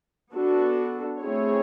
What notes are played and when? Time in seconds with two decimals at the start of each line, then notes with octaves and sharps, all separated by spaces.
0.33 B3 D4 F#4 A4
1.19 A3 C4 E4 G#4 C#5